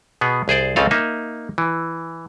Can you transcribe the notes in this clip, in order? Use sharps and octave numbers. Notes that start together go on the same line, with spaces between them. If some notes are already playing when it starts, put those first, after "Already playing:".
B2 B3 G#4
C2 G#4 C5 D5
C#2 C#3 C4 F4 A4 F5
A#3 D#4 E5
E3